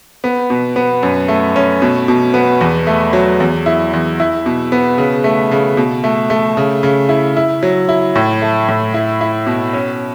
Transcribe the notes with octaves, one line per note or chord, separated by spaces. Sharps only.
B3
B2
B3
F#2
A3
C#4
B2
B2
B3
E2
A3
F#3
E2
E4
E2
E4
B2
B3
C#3
A3
C#3
B2
A3
A3
C#3
C#3
E4
E4
F#3
E4
A2
A3
A2
E4
E4
B2
C#4